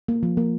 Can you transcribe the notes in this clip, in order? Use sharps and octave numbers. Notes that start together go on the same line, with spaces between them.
A#3
F3
A#3